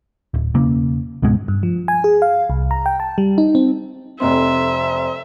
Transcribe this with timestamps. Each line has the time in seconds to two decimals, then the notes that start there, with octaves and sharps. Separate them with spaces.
0.34 D1
0.54 E1 C#3 A#3
1.22 C#2 G#2 B2 G#3
1.48 G2
1.63 F3
1.88 G#5
2.04 G#4
2.22 F5
2.50 C2
2.71 A#5
2.86 G5
3.00 A5
3.18 G3
3.38 D#4
3.55 C4
4.20 F1 F2 C4 C5 E5 A#5 C6